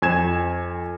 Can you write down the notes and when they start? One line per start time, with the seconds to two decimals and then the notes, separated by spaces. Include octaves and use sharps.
0.02 F2 G#5 G#6 E7